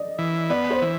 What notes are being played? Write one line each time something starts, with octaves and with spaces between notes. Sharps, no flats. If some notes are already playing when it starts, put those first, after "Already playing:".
Already playing: D5 D#5
E3
B3 D5
C5
E3